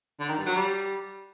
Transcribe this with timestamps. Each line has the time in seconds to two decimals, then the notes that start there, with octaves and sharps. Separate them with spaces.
0.20 D3
0.29 D#3
0.38 G2
0.47 F#3
0.55 G3